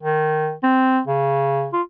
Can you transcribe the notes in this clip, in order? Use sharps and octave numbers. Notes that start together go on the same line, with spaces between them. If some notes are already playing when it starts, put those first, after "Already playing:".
D#3
C4
C#3
F4